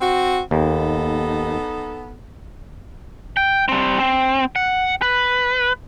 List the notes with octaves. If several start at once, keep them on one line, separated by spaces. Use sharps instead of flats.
C4 F#4
D#2 B3 D#4 A4
G5
G3 C4
C4
F#5
B4